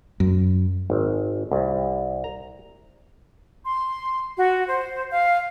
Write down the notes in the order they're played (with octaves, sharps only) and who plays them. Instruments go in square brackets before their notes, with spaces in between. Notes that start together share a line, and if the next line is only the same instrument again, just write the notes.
[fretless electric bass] F#2
[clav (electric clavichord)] G#1
C2
A#5
[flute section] C6
F#4
C5
F5